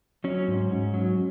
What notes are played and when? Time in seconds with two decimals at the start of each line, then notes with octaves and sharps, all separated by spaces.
0.24 F#3 C#4
0.48 G#2
0.71 G#2
0.94 F#3